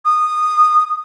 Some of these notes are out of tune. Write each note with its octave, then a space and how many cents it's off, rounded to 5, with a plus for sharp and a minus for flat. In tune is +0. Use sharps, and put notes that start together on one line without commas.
D#6 -15